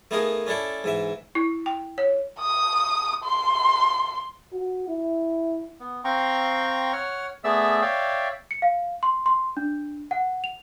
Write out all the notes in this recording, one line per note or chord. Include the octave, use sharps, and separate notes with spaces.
A3 B3 D#4 G#4 A#4 F5
C#4 D4 E4 A4 D5
G#2 E3 E5
E4
G5
C#5
D#6
C6
F#4
E4
B3
C4 F5 G5 A#5 C6 C#6
C#5 F#5 F6
A3 B3 G#4 D5 E5 E6
C#5 D5 E5 F5 G5
C#7
F5
C6
C6
D4
F#5
F7